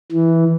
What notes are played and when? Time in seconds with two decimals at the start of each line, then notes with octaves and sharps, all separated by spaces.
0.12 E3